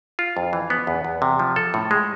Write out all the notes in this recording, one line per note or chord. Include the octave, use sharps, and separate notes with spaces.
F4
F2
E3
B3
E2
E2
C3
F3
A4
A2
G#3